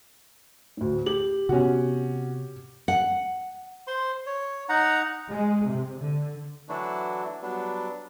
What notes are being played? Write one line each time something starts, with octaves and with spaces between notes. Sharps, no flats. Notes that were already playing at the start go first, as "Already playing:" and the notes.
D2 A2
G4 F#7
C3 B3 C#4 F#4
F#5
C5 C6
C#5
D#4 F#5 A#5
G#3
C3
D3
E3 F#3 A3 D4 E4 F#4
F#3 G3 B3 D4